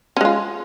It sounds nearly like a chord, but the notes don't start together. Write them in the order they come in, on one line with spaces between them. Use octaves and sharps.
C#4 G#3 F4